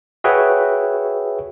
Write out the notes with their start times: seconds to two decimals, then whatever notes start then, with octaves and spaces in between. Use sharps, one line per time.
0.24 F#4 G#4 B4 C#5 E5 G5